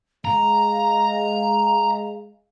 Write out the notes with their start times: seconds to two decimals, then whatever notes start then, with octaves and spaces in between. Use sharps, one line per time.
0.25 G#3 F5 A#5